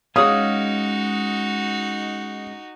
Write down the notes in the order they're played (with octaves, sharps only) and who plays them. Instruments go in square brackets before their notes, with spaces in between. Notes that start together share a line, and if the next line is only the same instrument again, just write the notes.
[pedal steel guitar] G#3 C#4 [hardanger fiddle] D#4 F#4 [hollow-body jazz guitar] G#4 C#5 F5 [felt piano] D#6